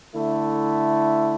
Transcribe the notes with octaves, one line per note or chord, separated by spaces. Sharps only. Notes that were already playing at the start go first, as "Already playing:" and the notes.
D3 A3 E4